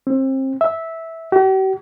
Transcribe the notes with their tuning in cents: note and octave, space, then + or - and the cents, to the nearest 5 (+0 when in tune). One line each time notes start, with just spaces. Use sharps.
C4 +30
E5 -10
G4 -45